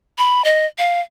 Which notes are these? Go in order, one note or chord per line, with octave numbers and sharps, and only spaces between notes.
B5
D#5
F5